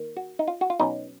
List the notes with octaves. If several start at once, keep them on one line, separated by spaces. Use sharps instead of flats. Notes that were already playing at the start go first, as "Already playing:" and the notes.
Already playing: D#3 A#3
F#4
D#4
F4
F#4
F4
B2 F#3 C#4 D#4